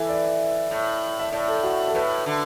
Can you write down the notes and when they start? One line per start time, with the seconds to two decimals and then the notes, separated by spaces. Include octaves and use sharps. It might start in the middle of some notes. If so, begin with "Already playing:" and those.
Already playing: E3 E4 A4
0.09 D5
0.71 A2
1.19 E5
1.32 A2 D5
1.48 A4
1.63 F#4
1.88 A4
1.95 A2 B4
2.26 D3